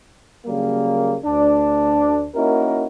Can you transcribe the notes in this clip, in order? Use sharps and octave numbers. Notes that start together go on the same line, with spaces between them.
C#3 F#3 G3 A#3
D2 D4
A#3 C#4 D#4 E4 F#4 A#4